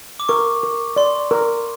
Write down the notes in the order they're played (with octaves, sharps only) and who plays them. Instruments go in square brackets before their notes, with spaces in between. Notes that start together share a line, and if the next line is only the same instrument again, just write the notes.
[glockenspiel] D6
[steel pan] A#4 [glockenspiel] C#6
[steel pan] A#4
[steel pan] D5 [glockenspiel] C6
[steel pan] A#4